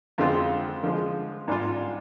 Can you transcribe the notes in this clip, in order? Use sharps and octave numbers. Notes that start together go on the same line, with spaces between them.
F2 D3 G#3 C4 F4
D3 F3 G#3
G#2 G3 D4 F4